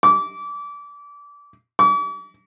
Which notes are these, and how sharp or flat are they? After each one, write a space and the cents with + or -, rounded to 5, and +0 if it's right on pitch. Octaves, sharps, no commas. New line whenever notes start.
D6 -25
D6 -45